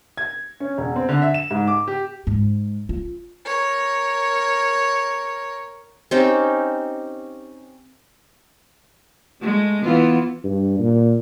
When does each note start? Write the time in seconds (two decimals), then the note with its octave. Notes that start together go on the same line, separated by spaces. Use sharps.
0.17 G#6
0.60 C#4
0.78 E1
0.96 C4
1.09 D3
1.22 E5
1.34 E7
1.51 G#2
1.68 D6
1.88 G4
2.27 G#2
2.89 F4
3.45 A#4 C#5
6.11 C4 C#4 D#4 G4
9.41 G#3 A3
9.82 E3 B3 F4
10.44 G2
10.79 A#2